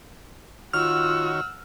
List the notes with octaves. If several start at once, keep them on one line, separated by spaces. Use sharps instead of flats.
D#3 F4 F#4 C#5 F#5 E6 F6